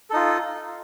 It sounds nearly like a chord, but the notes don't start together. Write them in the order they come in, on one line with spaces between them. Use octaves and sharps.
A4 D#4 F4